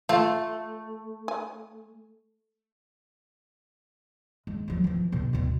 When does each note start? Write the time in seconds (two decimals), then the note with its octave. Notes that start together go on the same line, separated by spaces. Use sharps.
0.09 A3 F4 F5
1.28 G#5
4.47 G#3
4.68 F3 F#3
4.84 E3 F3
5.12 B2 D3
5.33 D2 B2